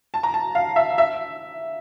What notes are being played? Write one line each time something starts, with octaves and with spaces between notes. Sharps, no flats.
A5
A#5
A5
F5
E5
E5